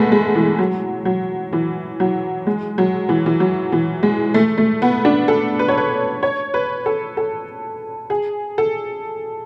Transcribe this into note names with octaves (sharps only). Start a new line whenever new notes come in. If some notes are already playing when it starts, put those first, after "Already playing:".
Already playing: G#3 A3 B3
G#3
E3
F#3
F#3
E3
F#3
G#3
F#3
E3
E3
F#3
E3
G#3
A3
A3
B3
D4
A4
B4
C#5
B4
C#5
B4
A4
A4
G#4
A4